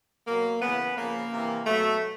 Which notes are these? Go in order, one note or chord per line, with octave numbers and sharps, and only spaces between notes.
B2 F#3 A#3
C#3 E3 B3
C#3 F3 A#3
C3 E3
B2 F#3 A3